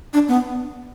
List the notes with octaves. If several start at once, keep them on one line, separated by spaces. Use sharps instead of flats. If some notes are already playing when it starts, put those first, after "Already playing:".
D4
B3